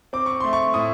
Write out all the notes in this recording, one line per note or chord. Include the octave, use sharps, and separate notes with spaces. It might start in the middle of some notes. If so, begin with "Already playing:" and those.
C4 D6
C#6
A3 C6
C#6
A2 D#6